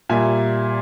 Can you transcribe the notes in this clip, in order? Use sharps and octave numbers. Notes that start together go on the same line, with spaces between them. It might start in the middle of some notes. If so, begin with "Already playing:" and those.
A#2 G3 A#3 E5 G#5